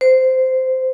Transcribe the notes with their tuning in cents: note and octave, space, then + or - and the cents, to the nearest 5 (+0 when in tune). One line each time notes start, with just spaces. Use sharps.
C5 -10